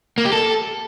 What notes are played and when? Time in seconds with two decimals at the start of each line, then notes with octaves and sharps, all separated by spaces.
0.18 A#3
0.25 G4
0.33 A4